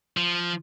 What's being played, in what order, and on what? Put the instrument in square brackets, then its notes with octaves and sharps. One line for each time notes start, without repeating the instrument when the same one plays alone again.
[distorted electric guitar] F3